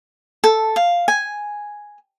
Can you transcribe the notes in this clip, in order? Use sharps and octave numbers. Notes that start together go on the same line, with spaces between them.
A4
F5
G#5